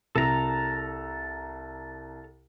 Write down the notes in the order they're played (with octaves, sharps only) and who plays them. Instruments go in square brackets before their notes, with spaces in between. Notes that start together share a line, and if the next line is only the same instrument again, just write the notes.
[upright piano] C2 [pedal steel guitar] A4 A#5